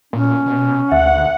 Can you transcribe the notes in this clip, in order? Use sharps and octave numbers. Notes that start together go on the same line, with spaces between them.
A#2 C#4
B2
D2 E5 F#5